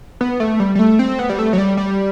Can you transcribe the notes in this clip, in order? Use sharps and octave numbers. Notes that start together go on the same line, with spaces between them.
B3
A3
G3
G3
A3
C4
B3
G3
A3
F#3
G3
G3